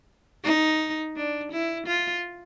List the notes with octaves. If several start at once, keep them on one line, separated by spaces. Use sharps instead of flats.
D#4
D4
E4
F4